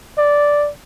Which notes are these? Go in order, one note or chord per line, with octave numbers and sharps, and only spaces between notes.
D5